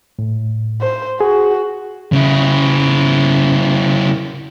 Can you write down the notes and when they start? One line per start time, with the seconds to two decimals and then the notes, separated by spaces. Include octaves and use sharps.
0.19 A2
0.81 C5
1.21 F#4 G#4
2.12 C#3 E4